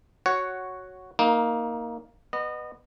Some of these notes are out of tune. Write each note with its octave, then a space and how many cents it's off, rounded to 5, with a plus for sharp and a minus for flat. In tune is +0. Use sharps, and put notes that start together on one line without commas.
F#4 +0 C#5 +0 F#5 +5
A#3 +0 D#4 +20
B3 +5 D#5 -30